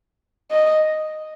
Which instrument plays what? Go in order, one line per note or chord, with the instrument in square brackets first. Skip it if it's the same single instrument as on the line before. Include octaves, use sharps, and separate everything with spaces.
[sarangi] D#5